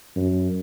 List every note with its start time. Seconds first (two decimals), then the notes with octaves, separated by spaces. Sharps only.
0.16 F#2